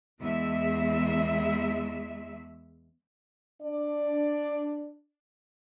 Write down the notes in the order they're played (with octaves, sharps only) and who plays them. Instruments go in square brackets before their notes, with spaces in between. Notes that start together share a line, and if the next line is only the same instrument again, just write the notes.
[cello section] E2 G#3 E5
[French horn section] D4 D5